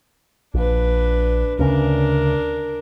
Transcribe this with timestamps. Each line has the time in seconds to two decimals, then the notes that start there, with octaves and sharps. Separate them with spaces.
0.54 A#1 D4 B4
1.59 D2 C#3 C#4 D4 A#4